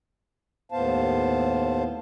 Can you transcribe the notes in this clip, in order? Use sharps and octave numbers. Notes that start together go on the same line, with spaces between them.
D#2 A2 B3 C5 F5 A5